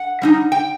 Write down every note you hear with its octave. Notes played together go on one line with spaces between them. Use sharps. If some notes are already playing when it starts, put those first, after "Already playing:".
Already playing: F#5
G3 C4 D#4
G5